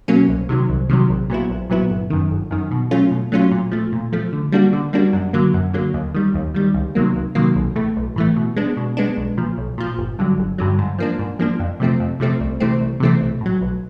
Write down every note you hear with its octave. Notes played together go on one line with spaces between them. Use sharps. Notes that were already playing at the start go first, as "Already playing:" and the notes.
B2 F#3 A#3 C#4
C2
C3 D#3 F#3
C2
C3 D#3 F#3
A#1
A#2 F#3 B3 E4
A#1
A#2 F#3 B3 E4
G1
F#2 D#3
G1
F#2 D#3
B2
F#3 A3 C#4 F4
B2
F#3 A3 C#4 F4
A#2
F3 A3
A#2
F3 A3
D3
G3 A#3 D4 F#4
D3
G3 A#3 D4 F#4
F#2
D3 F#3 A#3
F#2
D3 F#3 A#3
D#2
D#3 G3
D#2
D#3 G3
C#2
C3 D#3 F#3 A#3
C#2
C3 D#3 F#3 A#3
B1
A2 E3 A3
B1
A2 E3 A3
B2
G#3 B3 D4
B2
G#3 B3 D4
B1
A#2 F3
B1
A#2 F3
G1
G2 D3 F#3
G1
G2 D3 F#3
G#2
F3 A#3 D4
G#2
F3 A#3 D4
F2
C3 F3 A3 C4
F2
C3 F3 A3 C4
C2
C3 E3 A3 C4
C2
C3 E3 A3 C4
B1
A2 F#3
B1